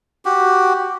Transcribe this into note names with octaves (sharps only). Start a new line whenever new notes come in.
F#4 G4